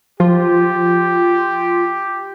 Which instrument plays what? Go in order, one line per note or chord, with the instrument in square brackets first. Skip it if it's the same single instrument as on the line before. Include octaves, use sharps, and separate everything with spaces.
[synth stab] F3 [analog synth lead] F4 [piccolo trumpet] G4